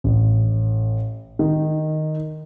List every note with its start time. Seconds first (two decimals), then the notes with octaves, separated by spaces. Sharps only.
0.04 A1
1.39 D#3